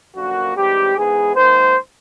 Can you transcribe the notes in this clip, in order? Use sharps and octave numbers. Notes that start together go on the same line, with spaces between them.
F#2 D3 F3 A#3 F#4
G#2 E3 G3 C4 G4
G#2 E3 G#3 B3 G#4
G#2 D#3 F#3 A#3 C5